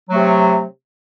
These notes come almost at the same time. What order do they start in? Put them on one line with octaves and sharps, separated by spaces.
F#3 A3 C3